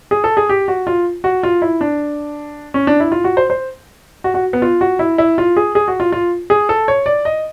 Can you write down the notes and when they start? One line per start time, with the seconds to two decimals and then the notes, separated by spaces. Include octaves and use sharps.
0.11 G#4
0.24 A4
0.37 G#4
0.49 G4
0.68 F#4
0.87 F4
1.24 F#4
1.43 F4
1.62 E4
1.81 D4
2.74 C#4
2.87 D4
3.00 E4
3.12 F4
3.24 F#4
3.37 C5
3.50 C5
4.24 F#4
4.34 F#4
4.53 B3
4.62 F4
4.81 F#4
4.99 E4
5.18 E4
5.38 F4
5.57 G#4
5.75 G#4
5.88 F#4
6.00 F4
6.12 F4
6.50 G#4
6.69 A4
6.88 C#5
7.06 D5
7.25 D#5